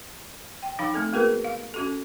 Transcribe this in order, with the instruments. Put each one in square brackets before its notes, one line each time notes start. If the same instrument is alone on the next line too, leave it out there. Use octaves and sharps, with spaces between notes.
[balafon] G5
F3 D#4 F5 G5 B5
A3 C4 A4
A#3 B3 F#4 G#4 A#4 B4
F5
C#4 F#4 A4